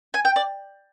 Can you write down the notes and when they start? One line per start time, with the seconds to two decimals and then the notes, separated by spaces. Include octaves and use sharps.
0.14 G#5
0.25 G5
0.36 D5